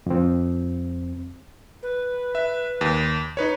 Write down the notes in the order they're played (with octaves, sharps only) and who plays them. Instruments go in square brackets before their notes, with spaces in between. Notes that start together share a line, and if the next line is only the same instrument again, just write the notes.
[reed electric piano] F2 C4
[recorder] B4
[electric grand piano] E5
D#2
D#4 B4 C#5